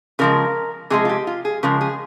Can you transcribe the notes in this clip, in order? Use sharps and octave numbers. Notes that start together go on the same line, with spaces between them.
C#3 F3 G#3 A#4
C3 F3 G#3 G#4
F4
G4
F4
G#4
C#3 F3 G#3 A#4
G#4